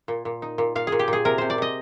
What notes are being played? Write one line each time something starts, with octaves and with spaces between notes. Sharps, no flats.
A#2
A#2
D#4
A#2
A#2 F5
G#4
A#2
G4
A#2 G#4
C3 A#4
C3 C5
D5
C3 D#5